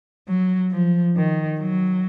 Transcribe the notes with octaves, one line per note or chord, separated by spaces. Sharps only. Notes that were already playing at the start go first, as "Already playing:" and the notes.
F#3
F3
D#3
F#3